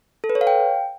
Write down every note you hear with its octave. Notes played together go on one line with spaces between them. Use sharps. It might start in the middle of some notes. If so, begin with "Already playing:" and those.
A4
B4
C#5
F5
G5